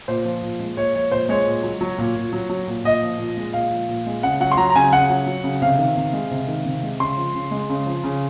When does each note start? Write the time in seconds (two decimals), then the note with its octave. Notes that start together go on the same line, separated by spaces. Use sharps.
0.08 A#2 C5
0.25 F3
0.42 A#2
0.60 G#3
0.77 A#2 C#5
0.95 F3 C#5
1.12 A#2 C5
1.29 G#3 C#5
1.47 A#2
1.63 F#3
1.81 F#3
1.98 A#2
2.16 A#2
2.33 F#3
2.50 F#3
2.67 A#2
2.84 A#2 D#5
3.02 F3
3.19 A#2
3.37 G#3
3.53 A#2 F5
3.71 F3
3.88 A#2
4.06 G#3
4.23 C#3 F#5
4.40 F#3 F#5
4.52 C6
4.57 F#3 A#5
4.70 A#5
4.75 C#3 G#5
4.92 C#3 F#5
5.10 F#3
5.26 F#3
5.44 C#3
5.62 C3 F5
5.78 D#3
5.97 C3
6.13 G#3
6.31 C3
6.48 D#3
6.65 C3
6.83 G#3
7.00 C#3 C6
7.17 F3
7.35 C#3
7.51 G#3
7.70 C#3
7.86 F3
8.04 C#3